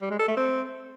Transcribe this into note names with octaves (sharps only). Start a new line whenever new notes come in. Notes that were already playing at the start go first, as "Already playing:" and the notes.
G3
G#3
A4
A3
C4